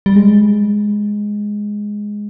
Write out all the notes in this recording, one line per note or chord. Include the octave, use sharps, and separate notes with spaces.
G3
G#3